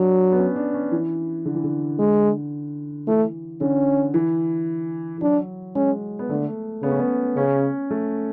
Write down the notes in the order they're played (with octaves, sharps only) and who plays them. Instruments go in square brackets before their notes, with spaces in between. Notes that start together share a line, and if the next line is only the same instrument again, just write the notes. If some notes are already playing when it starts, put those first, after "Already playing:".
Already playing: [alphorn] F#3 [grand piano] D4
[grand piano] B3
C#4
D4
C#4
E3
D3
E3
D3
[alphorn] G#3
[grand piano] E3 [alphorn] A3
[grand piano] D3 [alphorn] C#4
[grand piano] E3
E3
[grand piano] F#3 [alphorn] D4
[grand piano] G#3 [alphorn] C#4
[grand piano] B3
[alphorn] D3 [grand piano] A3
[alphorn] C#3 [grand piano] B3
[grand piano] C#4
B3
[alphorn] C#3 [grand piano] C#4
[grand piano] A3